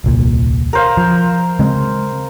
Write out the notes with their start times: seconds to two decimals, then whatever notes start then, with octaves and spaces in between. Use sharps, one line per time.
0.04 D#1 C2 A#2
0.73 A#4 C5 F5
0.97 F3
1.59 C#3 G#3 C4